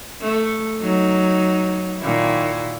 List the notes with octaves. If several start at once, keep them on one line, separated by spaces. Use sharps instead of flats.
A3
F#3 D#4
A#2 D#3 E4